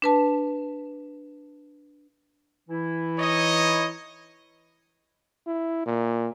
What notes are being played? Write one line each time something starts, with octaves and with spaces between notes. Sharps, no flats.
D4 B4 A5
E3 E4
D#4 C#5 D#5
E4
A#2